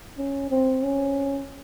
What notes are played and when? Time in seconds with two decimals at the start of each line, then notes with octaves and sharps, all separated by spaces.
0.18 C#4
0.50 C4
0.83 C#4